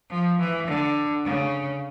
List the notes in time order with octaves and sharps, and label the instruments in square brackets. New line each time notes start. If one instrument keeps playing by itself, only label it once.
[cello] F3
E3
D3
C#3